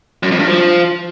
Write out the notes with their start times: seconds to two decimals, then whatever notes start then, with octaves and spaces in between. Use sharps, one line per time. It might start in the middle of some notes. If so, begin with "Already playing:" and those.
0.23 F#2
0.31 F2
0.39 G2
0.47 F3